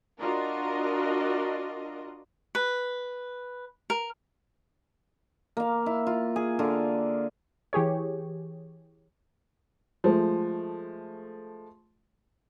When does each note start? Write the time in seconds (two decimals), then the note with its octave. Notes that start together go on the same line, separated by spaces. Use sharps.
0.19 D4 F4 F#4 A#4 D#5
2.55 B4
3.90 A#4
5.57 A#3 F5
5.86 E4
6.07 F4
6.36 G#4
6.59 D3 F4
7.73 E3 G4 G#4 C#5
10.04 F3 G#3 A3